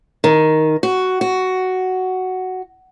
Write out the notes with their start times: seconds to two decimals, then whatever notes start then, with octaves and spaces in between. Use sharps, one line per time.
0.24 D#3
0.83 F#4
1.21 F#4